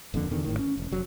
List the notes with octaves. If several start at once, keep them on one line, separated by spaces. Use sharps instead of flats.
D#1 F2 A#2 D3
E2 B2 D3 D#3
G#1 A2 D#3
C#4
E1
F1 F#3